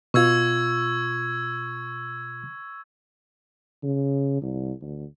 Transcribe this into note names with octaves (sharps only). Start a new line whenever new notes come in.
B2 F4 C#6 E6 G#6
C#3
C2
D2